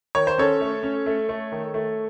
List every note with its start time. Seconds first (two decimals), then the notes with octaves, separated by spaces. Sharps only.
0.15 D#3 C#5
0.27 C5
0.38 C#4 A4 C#5
0.61 A3
0.83 C#4
1.06 A3
1.29 A3
1.52 D#3
1.74 A3